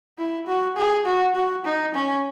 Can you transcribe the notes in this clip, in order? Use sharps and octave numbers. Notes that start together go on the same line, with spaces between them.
E4
F#4
G#4
F#4
F#4
D#4
C#4